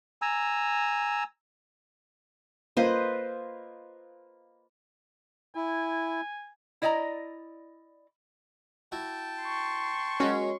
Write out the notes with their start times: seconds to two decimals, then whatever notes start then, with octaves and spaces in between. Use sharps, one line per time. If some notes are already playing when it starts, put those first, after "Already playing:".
0.22 G#5 A#5 E6
2.77 A#3 F4 B4 C5 D#5
5.55 E4 G#5
6.82 E4 D5 D#5 G5 A#5
8.92 E4 F#4 G5 A5
9.42 C6 C#6
10.20 F#3 G#3 A#3 C#4 F#4